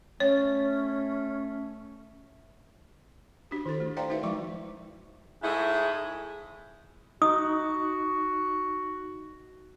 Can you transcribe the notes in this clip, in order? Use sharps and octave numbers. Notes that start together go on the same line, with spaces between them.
A3 C#4 C#5
D4 F#4 G4
D#3 E4 A4 C5
A3
C5 D5 F5 G5 A#5 C6
D#4 F#4 A#4 B4 E5 F5
F3 G#3 E4 E5 C#6
G#2 G#3 A3 E4 G#4
D#4 F#4 D#6